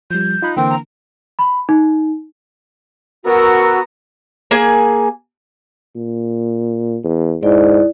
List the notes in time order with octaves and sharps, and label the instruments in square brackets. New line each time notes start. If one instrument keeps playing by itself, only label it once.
[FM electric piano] F3 G3 [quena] G6
[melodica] D#4 [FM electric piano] F4 B5 F#6
[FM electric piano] D3 E3 A#3 [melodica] C4 [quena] G5
[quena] A#5
[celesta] B5
D#4
[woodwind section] B3 A#5 [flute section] F#4 E6 [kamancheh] A#4
[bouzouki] A#3 G#4 G#5
[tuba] A#2
E2
[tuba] G#2 [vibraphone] E4 D5